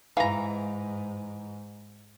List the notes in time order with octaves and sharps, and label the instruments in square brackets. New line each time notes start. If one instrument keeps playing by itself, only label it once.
[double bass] G#2 [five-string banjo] E3 A#5 [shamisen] F5 G#5 B5